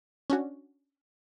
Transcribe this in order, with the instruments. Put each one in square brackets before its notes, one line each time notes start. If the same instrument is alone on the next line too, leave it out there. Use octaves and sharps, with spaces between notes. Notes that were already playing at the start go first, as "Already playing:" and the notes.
[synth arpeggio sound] C#4 D4 F#4